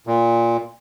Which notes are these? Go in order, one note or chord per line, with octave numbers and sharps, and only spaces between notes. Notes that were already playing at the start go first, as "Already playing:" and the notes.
A#2